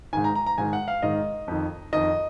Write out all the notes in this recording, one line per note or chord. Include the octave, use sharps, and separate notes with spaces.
G#2 D#3 G#5
A#5
A#5
A#5
G#2 D#3 G#5
F#5
F5
G#2 D#3 D#5
F2 D#3
F2 D#3 D#5